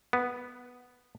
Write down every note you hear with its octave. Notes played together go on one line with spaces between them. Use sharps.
B3